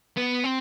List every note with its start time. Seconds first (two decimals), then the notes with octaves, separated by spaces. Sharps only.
0.17 B3
0.44 C4